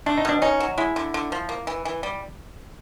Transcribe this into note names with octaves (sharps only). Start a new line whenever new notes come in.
A3 D4
D#4
B2 D4
C#4 D#4
F#3
G#3 E4
D3
D3
F3
A#3
E3
E3
G3